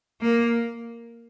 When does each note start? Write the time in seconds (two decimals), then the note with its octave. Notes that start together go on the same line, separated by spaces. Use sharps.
0.21 A#3